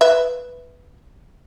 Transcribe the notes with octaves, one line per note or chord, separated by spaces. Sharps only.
B4 E5